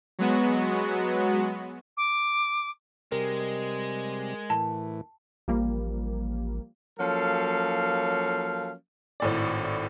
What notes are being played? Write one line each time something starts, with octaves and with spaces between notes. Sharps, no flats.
F#3 G#3 B3 F#4
D6
C3 G3 G#3 A#4
A2 E3 A5
A1 F3 G3 A#3
F3 F#3 A#3 C#4 A4 F5
G#1 A2 D5